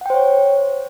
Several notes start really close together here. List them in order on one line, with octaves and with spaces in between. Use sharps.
F#5 G5 C5 C#5